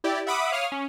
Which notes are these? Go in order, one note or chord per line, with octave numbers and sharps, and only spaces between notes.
E4 G4 D5
E5 F#5 B5 D6 D#6
C#5 F5 D#6 F6
C#4